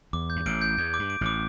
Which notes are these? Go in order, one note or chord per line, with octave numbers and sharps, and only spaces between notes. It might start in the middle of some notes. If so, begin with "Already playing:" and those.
E2 D6
G6
G2
A1 A2 D7
G6
E2 G6
D6
G2
D7
A1 A2 D6